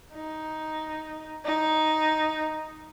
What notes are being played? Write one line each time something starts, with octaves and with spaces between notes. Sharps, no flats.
D#4
D#4